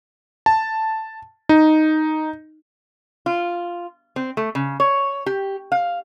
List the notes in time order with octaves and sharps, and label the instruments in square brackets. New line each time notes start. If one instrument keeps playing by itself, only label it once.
[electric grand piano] A5
D#4
[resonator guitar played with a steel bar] F4
C4
A3
C#3
C#5
G4
F5